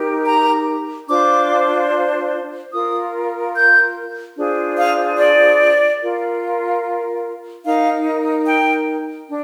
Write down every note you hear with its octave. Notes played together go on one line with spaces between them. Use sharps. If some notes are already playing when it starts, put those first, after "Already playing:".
Already playing: D#4 G4 A#4
A#5
D4 F4 C5 D6
F4 A#4 D#6
G6
D4 F4 G#4 C5
F5
D5
F4 A#4
D#4 A#4 F5
G5
D4